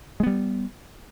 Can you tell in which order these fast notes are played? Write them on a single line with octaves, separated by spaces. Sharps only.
G#3 B3 G3